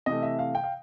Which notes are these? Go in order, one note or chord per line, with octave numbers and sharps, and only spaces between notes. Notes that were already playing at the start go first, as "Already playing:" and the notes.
C3 E3 A3 D#5
E5
F5
G5
F5